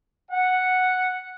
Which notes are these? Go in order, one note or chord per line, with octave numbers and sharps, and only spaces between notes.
F#5